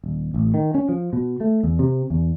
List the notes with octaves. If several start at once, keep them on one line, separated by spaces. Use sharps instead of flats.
D#1
A1
D#3
C#4
F3
B2
A3
E2
C3
E2